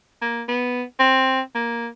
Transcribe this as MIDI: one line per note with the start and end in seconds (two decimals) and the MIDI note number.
0.21 0.43 58
0.48 0.83 59
0.99 1.41 60
1.55 1.87 58